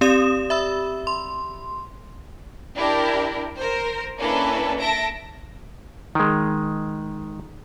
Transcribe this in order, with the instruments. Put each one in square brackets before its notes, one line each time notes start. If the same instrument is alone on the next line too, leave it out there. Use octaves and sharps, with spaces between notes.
[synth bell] C4 G4 D5 D#6 E7
E5 B5 E6
C6
[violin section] D4 E4 G4 A#4
A#4 C5
A#3 C#4 D4 E4 A4 B4
A4 E5 A5 A#6 D7
[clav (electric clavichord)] D#3 G#3